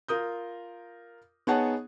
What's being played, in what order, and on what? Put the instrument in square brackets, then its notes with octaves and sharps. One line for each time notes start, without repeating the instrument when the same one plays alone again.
[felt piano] F4 A#4 D#6 G6
B3 D#4 G#4 C#5 F#5 A5